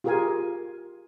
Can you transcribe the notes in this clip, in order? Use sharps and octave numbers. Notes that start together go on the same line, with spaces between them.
F4 G4 G#4 A#4 F5 G#5